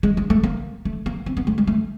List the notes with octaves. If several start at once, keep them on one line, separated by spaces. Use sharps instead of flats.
G#3
G#3
A3
A#3
A3
A#3
C4
B3
A3
G#3
A3